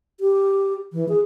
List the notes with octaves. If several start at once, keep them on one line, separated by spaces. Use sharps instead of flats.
G4
E3
G#4